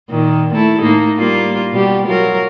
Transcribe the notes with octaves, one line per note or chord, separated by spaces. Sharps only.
A#2 D#3
A3 E4 A4
A2 A#3 D#4
G3 A#3 F4
B2 G3 G4
F#3 F4 A#4